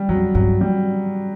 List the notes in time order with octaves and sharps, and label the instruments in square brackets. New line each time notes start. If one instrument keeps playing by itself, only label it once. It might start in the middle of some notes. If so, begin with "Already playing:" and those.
Already playing: [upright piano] G3
[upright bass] F#2 [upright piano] F#3
[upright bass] G2 [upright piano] F#3
[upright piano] G3